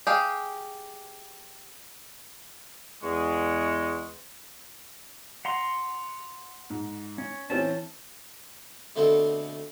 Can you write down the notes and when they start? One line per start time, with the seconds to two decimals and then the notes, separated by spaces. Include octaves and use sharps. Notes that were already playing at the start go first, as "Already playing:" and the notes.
0.07 G4 G#4 F5
3.03 E2 G#3 C#6
5.45 F#5 A#5 C6
6.70 G#2
7.18 C#4
7.50 E3 C4 C#4 A5
8.96 B2 D3 A3 B3 C4